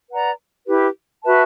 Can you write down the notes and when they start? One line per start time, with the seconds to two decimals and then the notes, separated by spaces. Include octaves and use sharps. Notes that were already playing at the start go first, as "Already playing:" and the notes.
0.11 B4 D5 F#5 A#5
0.67 E4 G4 B4
1.23 F#4 B4 E5 A5